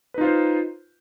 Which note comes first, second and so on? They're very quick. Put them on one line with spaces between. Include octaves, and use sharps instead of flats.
B4 D#4 F4 C5